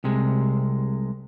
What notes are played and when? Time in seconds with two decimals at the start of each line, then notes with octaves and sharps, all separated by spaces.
0.04 C2 C3 G#3